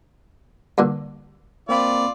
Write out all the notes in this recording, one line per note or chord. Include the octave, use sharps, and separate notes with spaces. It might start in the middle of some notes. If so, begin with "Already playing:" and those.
G2 A#2 D3
A#3 C4 F4 D5 B5